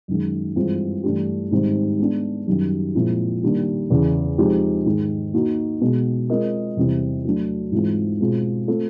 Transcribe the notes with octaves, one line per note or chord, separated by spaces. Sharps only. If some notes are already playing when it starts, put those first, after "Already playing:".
F#2 D#3 G#3
G2 E3 G#3 C4 F4
G2 E3 A3 D4 G4
G#2 D#3 G3 C4
G#3 B3 D4
F#2 D#3 G3
A#2 F3 G#3 C4 E4
D#3 G3 A#3 D4
E2 C#3 E3
F3 G#3 C4 D#4 G4
G#2 D#3 G#3
A#3 D#4 F#4
B2 G#3 B3
G#3 C4 F4 A#4 D#5
E2 C3 E3 G3 C4
F#3 A3 D4
G#2 E3 G#3 C4 F4
B2 G#3 C4 F4
A3 C4 F4 A4